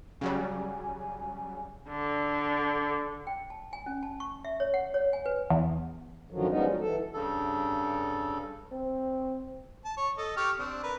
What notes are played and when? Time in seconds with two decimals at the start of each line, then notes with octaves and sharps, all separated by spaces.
0.21 C#3 F#3 G3 G#5
1.89 D3
3.27 G5
3.50 A5
3.73 G#5
3.86 C#4
4.03 A5
4.20 C#6
4.45 E5
4.60 C#5
4.74 F#5
4.94 C#5
5.13 G#5
5.26 B4
5.50 E2
6.31 F#2 D3 D#3 F3 F#3
6.49 F3 G3 G#3 B3 C#4 D#4
6.67 F#3
6.80 E3 A4
7.13 G2 C#3 A4
8.71 C4
9.84 A5
9.97 C#5
10.18 A4 D#5
10.37 G4 C#6 F6
10.59 C4 D4
10.83 A#4 B4